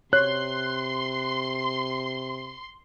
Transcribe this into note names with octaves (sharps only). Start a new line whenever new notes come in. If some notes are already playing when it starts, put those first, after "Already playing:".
C3 C#5 C6 F#6